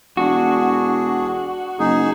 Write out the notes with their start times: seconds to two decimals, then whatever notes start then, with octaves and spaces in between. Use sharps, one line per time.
0.17 E1 D4 F#4 G#4
1.79 F#1 D#4 G#4